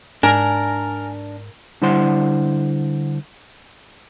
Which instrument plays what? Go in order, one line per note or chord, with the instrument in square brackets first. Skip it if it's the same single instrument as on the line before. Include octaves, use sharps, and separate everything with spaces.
[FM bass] G#2 [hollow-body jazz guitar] D4 [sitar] A#4 [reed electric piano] G#5
[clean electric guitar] D3 G3 E4 C5 F#5 C6